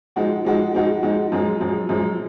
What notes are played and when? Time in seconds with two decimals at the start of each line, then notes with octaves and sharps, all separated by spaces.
0.16 F3 G#3 D#4 F#4
0.45 F3 G#3 D#4 F#4
0.74 F3 G#3 D#4 F#4
1.03 F3 G#3 D#4 F#4
1.32 F#2 F3 G#3
1.60 F#2 F3 G#3
1.89 F#2 F3 G#3